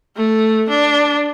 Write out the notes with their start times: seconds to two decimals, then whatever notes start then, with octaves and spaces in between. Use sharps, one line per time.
0.17 A3
0.69 D4